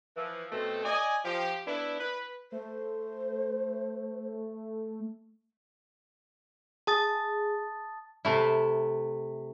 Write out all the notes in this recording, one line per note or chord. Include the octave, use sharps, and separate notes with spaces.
E3 F3
B2 A3 C4 A4
D5 D#5 G#5
F3 G4
B3 D4 E4
B4
A3 C5
G#4 A5 D#6 A6
C3 A3 E4